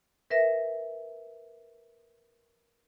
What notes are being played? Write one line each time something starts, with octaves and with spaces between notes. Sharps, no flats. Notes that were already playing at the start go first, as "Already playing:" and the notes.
A#4 B4 E5 A#6